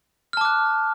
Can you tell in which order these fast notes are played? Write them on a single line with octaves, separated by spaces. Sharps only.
F6 A5 D6 F#6